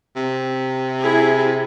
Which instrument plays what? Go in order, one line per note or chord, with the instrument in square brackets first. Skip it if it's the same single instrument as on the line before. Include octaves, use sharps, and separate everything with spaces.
[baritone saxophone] C3
[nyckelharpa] E4 G#4